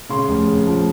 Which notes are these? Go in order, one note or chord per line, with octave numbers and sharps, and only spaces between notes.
C#3 C6
F1
C#3
F3